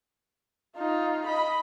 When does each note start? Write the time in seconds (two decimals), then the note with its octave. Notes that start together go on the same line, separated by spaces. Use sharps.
0.77 D#4 F4
1.26 D#5 B5